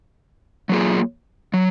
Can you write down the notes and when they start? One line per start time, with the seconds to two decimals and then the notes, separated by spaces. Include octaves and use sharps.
0.69 F#3 A#3 F4 G#4
1.54 F#3